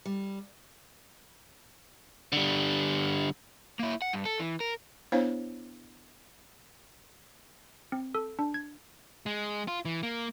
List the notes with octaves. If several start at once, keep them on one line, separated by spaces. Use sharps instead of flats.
G3
D3 G3
A#3 E4
F#5
G2
A4
E3
A#4
B3 D4 E4 C5 C#5 F5
C4
A4
D4
G#6
G#3
F4
E3
A#3